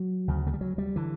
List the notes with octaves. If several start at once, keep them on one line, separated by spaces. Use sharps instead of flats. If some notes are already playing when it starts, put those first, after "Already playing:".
Already playing: F#3
D2 C#3
A3
G3
F#3
G3
D3 E3